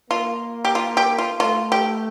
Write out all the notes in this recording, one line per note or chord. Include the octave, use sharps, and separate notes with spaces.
A#3 F4
G4
F4
G4
F4
A3 F4
G4